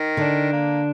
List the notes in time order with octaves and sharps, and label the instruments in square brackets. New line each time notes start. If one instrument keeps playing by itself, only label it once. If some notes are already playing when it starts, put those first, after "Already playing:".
Already playing: [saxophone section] D#3
[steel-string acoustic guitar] D3 [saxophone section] D4
[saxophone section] A#3